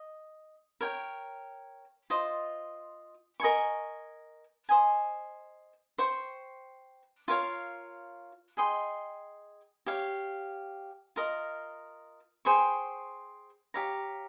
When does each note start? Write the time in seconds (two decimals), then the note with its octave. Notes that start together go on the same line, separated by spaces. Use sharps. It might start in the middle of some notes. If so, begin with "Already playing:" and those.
Already playing: D#5
0.81 A#4 C#5 G5
2.10 F4 C5 D#5
3.40 A#4 D#5 G#5 C#6
4.69 C5 D#5 G#5
5.98 C5 G5 C#6
7.28 F4 A#4 C#5 F5
8.57 G#4 D#5 G5 C6
9.86 G4 C#5 F5
11.16 F4 A#4 D#5
12.45 G#4 C5 G5 C#6
13.74 G4 C#5 F5 A#5